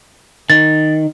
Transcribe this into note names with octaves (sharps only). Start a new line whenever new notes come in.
D#3 A6